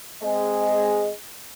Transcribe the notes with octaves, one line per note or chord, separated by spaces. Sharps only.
G#3 C4 G#4 D#5